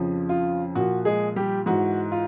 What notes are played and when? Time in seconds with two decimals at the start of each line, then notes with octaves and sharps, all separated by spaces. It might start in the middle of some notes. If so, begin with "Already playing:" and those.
Already playing: F2 C#3 F3
0.29 F4
0.75 A#2 F3 F#4
1.05 G#3 G#4
1.36 G3 G4
1.66 G#2 E3 F#4
2.12 F4